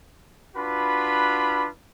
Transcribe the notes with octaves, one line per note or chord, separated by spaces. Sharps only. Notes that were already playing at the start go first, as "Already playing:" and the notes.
D4 F4 F#4 B4 B5